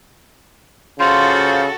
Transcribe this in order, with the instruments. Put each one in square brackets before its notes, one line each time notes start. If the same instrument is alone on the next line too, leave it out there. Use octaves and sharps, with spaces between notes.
[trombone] C#3 [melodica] F4 C5 [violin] F#4 A4